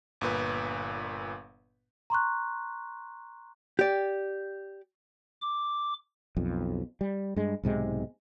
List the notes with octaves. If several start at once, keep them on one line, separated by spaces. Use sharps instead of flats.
G1 A#2 B4
A#5 C6 C#6 F#6
G4 D5
D6
B1 F2
G3
G2 G#3
B1 G#2 C3 G#3